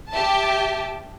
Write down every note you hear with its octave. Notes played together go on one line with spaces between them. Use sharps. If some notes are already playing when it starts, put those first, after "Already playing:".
G4 E5 A5